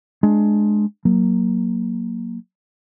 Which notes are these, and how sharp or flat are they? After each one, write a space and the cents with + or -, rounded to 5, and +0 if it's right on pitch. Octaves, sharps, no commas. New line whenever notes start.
G#3 +15 D4 +15
F#3 +0 A#3 +0